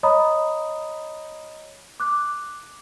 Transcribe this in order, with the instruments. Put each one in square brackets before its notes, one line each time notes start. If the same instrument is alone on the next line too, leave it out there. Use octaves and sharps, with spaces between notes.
[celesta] C#5 D#5 A#5 B5 D#6
D6 F#6